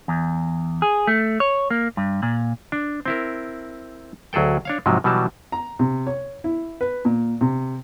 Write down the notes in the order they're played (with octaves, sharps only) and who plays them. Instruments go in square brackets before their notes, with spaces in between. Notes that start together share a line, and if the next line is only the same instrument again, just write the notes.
[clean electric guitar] E2
G#4
A3
C#5
A#3
G2
A#2
[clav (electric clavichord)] D4
C4 E4 A#4
D2 F#3 G#4 A4 G5
D4 C#5 F5
G#2 C3 F3 F#3
B2 E3 F#3 G3 A5
[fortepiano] A#5
C3
C#5
E4
B4
A#2
C3